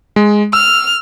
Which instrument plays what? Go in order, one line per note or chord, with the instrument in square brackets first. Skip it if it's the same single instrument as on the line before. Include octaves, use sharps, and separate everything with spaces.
[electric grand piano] G#3
[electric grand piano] E6 [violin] F6